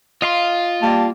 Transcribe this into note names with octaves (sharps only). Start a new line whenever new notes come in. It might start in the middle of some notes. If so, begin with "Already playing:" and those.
F4 D#5 F5 C6
G3 A#3 A5